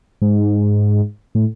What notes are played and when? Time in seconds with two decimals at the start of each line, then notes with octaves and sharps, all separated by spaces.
0.22 G#2
1.35 A2